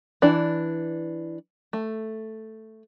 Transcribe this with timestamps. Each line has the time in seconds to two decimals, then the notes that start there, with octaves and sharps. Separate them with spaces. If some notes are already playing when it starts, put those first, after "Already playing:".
0.22 E3 D4 D5
1.73 A3